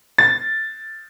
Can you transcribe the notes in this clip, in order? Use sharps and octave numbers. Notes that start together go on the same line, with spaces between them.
A6